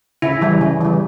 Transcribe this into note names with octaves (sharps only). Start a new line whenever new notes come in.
C#3 E4
E3 G3
C#3
E3 G3